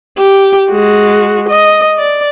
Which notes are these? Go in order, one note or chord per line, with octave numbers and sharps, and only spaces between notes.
G4
G#3 F#4
D#5
D5